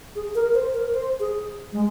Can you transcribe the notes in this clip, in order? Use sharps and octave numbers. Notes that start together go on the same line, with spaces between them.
G#4
A#4
C5
A#4
C5
G#4
G#3